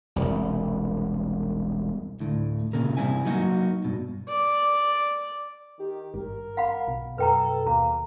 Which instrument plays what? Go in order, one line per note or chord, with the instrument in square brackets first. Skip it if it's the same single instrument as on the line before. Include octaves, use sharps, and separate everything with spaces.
[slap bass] E1 C2
[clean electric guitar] D2 A2
A#2 C#3 A#4
C2 G2 C4 E4 G#5
F#3 A#3 D#4 F#4
G2 B2
[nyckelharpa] D5
[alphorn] D#3 [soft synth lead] G4
[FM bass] G#1 [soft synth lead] G2 [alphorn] A#4
[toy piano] F5 F#5 B5
[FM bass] B1 [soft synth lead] B2
[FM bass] F#2 [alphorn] A4 [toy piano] B4 G5 A#5
[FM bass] D#2 [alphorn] A#3 [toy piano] A#5